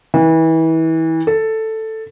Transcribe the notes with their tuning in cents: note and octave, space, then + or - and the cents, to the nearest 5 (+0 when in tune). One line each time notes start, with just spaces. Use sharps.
E3 -30
A4 +5